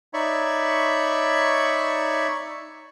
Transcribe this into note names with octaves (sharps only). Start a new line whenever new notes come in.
D#4 C#5 D5 E5 B5 C#6